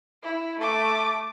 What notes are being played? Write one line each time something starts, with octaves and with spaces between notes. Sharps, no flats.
E4
A3 D6